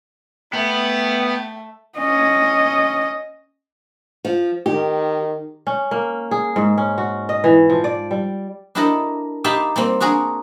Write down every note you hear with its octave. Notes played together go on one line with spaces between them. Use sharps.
A3 B3 G5
C#4 D#5
F3
D#3 G4
C#4
A#3
G#4
G#2
C#4
F#4
D#5
E3
F3
D5
G3
D4 E4 G4 A4 A#4 D#5
D#4 G4 E5 F5 A5 B5
G3 A#3 C4
D4 F#4 G#4 A#4